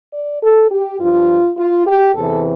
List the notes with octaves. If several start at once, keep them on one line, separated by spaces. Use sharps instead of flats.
D5
A4
G4
G2 F3 F4
F4
G4
E2 C3 E3 A4